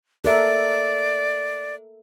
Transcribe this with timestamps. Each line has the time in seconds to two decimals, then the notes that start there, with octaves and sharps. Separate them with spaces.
0.25 A4 A#4 D5 E5